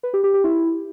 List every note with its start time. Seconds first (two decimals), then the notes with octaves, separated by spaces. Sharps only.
0.03 B4
0.14 G4
0.24 G4
0.34 G4
0.44 E4